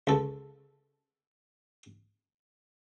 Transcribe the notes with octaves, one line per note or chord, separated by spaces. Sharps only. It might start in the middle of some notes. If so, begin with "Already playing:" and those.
C#2 A4